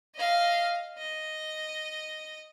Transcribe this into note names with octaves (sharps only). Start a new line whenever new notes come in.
D#5 F5
D#5